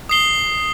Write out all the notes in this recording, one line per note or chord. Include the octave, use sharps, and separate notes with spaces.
D#6 C7 G7